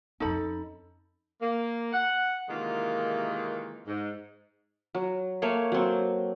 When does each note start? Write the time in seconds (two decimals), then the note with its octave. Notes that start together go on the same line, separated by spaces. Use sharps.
0.20 F2 C#4 D#4 A4 B5
1.42 A#3
1.93 F#5
2.49 C3 D#3 E3 G#3 A#3 F4
3.87 G#2
4.95 F#3
5.42 A3 A#3 C#5 F5
5.72 F#3 C4